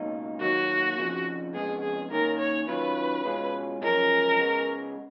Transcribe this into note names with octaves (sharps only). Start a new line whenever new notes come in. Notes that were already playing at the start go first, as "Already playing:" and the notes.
Already playing: C#2 B2 A#3 D#4
D#2 D#3 F#3 A#3 F#4
F2 C#3 F3
F2 C#3 G#3 B3 G#4
G#4
D#2 D#3 A#3 C#4 A#4
C#5
D#3 F#3 C#4 F4 B4
B2 G#3 C#4 F4
F#2 C#3 F3 G#3 C#4 A#4
C#3 G#3 B3